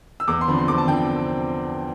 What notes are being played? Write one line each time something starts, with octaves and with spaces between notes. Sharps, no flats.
E6
E2 D6
C6
D3 F3 C4 B5
C6
E2 D6
A5
D3 F3 C4 G5